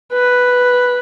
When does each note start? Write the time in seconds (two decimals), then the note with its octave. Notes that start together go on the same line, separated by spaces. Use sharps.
0.13 B4